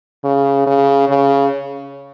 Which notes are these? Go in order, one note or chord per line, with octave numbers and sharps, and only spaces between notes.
C#3
C#3
C#3